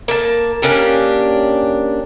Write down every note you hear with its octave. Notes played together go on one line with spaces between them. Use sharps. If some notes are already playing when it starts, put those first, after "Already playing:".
A#3 A5
A#3 C#4 D4 G4